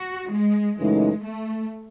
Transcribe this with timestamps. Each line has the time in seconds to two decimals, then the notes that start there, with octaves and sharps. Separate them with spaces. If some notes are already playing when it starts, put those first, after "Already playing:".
Already playing: F#4
0.31 G#3
0.77 F#2 C#3 E3 G#3 A3 D#4
1.24 A3